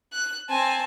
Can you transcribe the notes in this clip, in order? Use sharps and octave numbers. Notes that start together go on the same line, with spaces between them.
F#6
C4 G#5 A5